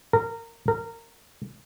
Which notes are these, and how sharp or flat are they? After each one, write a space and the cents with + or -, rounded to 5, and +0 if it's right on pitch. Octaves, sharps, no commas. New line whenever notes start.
A#4 -20
A#4 -20